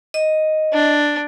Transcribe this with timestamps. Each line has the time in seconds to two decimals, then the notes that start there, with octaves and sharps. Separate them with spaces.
0.14 D#5
0.73 D4